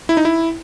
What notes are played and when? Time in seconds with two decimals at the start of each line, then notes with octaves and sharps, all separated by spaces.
0.09 E4
0.17 D#4
0.25 E4